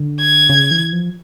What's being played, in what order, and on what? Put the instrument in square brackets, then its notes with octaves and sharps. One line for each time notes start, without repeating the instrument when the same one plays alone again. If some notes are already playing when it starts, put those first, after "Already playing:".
Already playing: [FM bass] D3
[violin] G#6
[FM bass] C#3
E3
F3